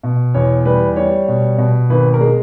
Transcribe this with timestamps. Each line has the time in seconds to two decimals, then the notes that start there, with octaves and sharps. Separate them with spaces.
0.03 B2
0.34 E2 C#5
0.65 G3 B4
0.96 G3 C#5
1.28 B2
1.58 B2
1.90 G#1 B4
2.14 A#4
2.21 G#3